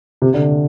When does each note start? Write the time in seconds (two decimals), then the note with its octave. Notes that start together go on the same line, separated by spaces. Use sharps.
0.22 C3
0.34 D3